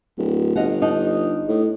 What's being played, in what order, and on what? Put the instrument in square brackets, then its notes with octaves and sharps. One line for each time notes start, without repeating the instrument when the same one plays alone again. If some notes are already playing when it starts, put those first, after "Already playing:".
[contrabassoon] D1
[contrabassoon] G1 [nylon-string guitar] D#5 F5 F#5
[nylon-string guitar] D4 D#4
[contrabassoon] A2